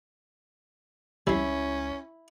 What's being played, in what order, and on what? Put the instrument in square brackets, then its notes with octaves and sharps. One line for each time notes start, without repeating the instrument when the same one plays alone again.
[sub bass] C#2 [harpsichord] G3 C4 [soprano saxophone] C#4 [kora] E4